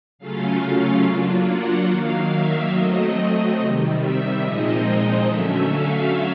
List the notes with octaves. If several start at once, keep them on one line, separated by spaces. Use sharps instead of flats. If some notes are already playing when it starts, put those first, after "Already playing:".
C#3 F#3 A3 C#4 F4 F5
F5
F#3 A#3 D4 F4
F#5
D#3 F#3 A#3 F5
E5
F#3 A3 C4 D#5
D#5
C3 D#3 G3
E5
A#2 F3 G#3 C4 D#4 D#5
D#5
D3 F#3 A3 C#4 E5
F5